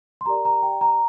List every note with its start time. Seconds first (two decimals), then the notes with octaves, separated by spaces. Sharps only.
0.21 C6
0.26 G4 A#4 D5 A#5
0.45 A#5
0.62 G4 D5 G5
0.81 A#5